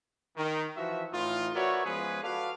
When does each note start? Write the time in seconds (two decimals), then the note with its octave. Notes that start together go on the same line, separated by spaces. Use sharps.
0.37 D#3
0.76 E3 F3 F#4 E5
1.12 A2 E3 D#4 F4
1.54 F#4 A#4 B4 C#5 D5 E5
1.85 F3 G#3 B3 C#4 G#4 B4
2.23 F#4 A4 B4 D5 F5